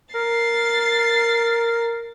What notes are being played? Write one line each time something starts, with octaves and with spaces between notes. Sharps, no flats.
A#4 A6 C7